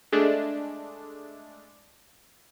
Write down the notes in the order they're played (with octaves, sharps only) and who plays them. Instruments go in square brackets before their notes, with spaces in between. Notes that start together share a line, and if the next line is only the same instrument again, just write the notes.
[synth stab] G#3 A3 D4